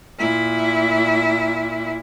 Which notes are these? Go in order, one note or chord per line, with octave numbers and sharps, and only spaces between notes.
A#2 E4